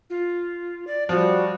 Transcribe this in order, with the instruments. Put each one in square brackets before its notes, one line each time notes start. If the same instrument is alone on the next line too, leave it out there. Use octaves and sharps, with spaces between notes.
[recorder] F4
D5
[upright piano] F3 [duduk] G3 [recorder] F#4